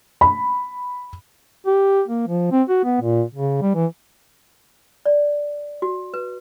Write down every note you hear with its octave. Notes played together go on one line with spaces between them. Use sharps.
B5
G4
A#3
F3
C4
F#4
B3
A#2
C#3
G3
E3
D5
F#4
B4